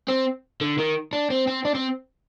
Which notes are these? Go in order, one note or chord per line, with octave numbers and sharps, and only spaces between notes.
C4
D3
D#3
D4
C4
C4
D4
C4